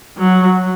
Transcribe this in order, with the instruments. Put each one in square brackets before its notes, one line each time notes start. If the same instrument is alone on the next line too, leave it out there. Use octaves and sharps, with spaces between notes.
[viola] F#3